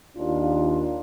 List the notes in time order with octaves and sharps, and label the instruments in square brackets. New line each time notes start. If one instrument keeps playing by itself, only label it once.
[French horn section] D#2 D4 F4